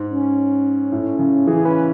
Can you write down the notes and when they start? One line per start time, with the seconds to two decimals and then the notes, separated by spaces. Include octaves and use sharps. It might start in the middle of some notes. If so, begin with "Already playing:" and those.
Already playing: G#2
0.10 C#4
0.92 A2
1.19 C#3
1.47 E3 G#4
1.65 C#4 B4